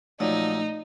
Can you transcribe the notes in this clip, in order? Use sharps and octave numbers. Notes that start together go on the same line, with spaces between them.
A#2 F3 F#3 A3 D#4